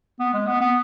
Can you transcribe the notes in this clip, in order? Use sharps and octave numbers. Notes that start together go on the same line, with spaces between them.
B3
G#3
B3
B3